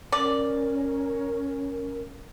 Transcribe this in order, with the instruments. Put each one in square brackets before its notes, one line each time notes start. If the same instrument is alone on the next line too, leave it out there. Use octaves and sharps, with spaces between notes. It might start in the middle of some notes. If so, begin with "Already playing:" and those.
[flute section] C#4 A#4 [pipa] D5